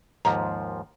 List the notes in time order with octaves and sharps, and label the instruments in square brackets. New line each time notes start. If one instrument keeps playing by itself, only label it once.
[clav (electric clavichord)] D#2 G#2 F3 [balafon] A#5